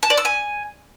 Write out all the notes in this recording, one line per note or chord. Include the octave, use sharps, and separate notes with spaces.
A5
D5
E6
G#5